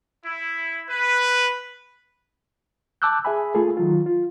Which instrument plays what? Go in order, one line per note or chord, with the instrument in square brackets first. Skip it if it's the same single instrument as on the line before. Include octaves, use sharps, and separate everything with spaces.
[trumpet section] E4
B4
[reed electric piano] A5 D6 E6 F#6 G6
G#4 E5 G#5 B5
A3 F4 G#4 A4
D#3 F#3 F4
F4